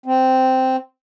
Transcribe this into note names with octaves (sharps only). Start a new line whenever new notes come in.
C4